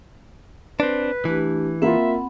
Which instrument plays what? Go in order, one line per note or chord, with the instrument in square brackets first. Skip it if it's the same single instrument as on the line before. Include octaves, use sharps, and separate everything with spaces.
[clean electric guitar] C4 D4 [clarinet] B4
[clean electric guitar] E3 [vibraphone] A3 D4 G4
[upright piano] A#3 F4 [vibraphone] C4 F#5 B5 [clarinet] E5